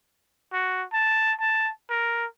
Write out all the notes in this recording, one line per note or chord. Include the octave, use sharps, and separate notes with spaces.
F#4
A5
A5
A#4